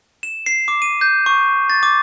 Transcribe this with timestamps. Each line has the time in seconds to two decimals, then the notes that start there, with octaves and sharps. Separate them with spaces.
0.23 E7
0.46 C7
0.68 D6
0.82 D#7
1.01 G6
1.26 C#6
1.70 A6
1.83 D6